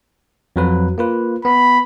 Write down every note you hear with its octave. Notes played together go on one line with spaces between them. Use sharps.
F2 F#3 B4
A#3 F4 B4
B3 B5